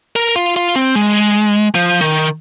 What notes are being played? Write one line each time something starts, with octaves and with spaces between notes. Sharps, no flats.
A#4
F4
F4
C4
G#3
F3
D#3